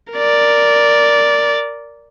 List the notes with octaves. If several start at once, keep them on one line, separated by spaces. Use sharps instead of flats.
A#4 D5